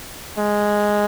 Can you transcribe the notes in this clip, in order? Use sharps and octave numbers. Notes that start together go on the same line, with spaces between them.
G#3